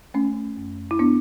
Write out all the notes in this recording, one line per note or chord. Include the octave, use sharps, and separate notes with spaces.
A3 C#4
F#2
E4
B3 D4